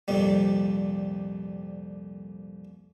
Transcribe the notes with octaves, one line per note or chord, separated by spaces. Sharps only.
C2 F2 A#2 G3